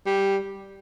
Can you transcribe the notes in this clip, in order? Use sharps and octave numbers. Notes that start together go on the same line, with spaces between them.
G3